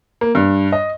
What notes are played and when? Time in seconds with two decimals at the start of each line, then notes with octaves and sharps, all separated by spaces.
0.21 A#3
0.35 G2
0.72 D#5